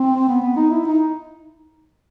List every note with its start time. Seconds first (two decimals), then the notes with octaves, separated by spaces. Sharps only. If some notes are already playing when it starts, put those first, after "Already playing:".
Already playing: C4
0.29 B3
0.42 B3
0.57 D#4
0.71 E4
0.86 D#4